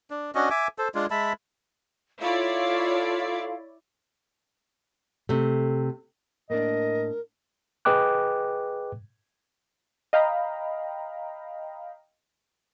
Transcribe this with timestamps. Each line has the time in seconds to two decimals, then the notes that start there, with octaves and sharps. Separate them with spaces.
0.11 D4
0.35 C#4 D4 F#4 D#5
0.50 E5 G#5 D6
0.78 A4 C5
0.95 G#3 D4 F4
1.11 G#3 E5 A5 B5
2.20 E4 F4 A4 C#5 D5 F5
5.29 C3 A3
6.50 A2 A#3 D4 A#4 D#5
7.85 G#4 B4 D#5 G5 D6 F#6
10.13 D#5 F5 G5 A#5 B5